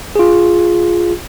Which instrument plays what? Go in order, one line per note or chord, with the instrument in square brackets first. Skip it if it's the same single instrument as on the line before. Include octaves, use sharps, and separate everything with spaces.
[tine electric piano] F4 G#4